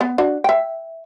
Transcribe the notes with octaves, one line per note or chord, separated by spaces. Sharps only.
B3
D4 F#4
E5 G5